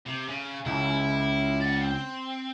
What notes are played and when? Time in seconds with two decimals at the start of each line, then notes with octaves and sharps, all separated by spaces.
0.06 C3
0.28 C#3
0.66 C#2 E4
1.61 D5 F#5
1.82 C4